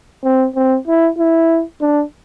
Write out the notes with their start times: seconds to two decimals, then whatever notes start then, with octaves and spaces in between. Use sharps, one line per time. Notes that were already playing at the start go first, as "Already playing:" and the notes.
0.24 C4
0.56 C4
0.87 E4
1.18 E4
1.81 D4